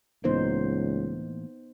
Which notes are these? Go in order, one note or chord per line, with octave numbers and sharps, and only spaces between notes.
C#2 A2 E3 A#3 B3 D#4 C5